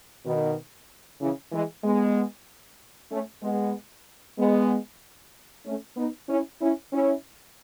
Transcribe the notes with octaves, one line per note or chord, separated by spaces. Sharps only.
B2 D#3
C#3 E3
E3 G#3
G#3 B3
A3 C#4
G#3 B3
G#3 B3
A3 C#4
B3 D#4
C#4 E4
C#4 E4
C#4 E4